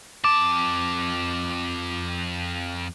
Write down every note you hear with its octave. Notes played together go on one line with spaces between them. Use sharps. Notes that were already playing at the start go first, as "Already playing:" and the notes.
F2 A5 D6